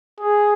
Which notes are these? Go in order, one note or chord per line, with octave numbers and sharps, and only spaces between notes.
G#4